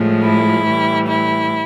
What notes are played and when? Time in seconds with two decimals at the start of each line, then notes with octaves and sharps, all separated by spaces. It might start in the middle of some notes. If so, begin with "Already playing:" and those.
Already playing: A2 F3 G#3
0.25 E4
0.67 A2 E3 G3
1.08 E4